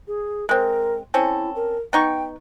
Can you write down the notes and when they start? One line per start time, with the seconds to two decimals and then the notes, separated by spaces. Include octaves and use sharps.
0.08 G#4
0.49 G#3 C4 A#4
1.14 C4 C#4 E4 A4
1.55 A#4
1.93 B3 D#4 G5 C#6